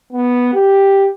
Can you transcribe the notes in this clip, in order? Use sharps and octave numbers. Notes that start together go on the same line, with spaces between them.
B3
G4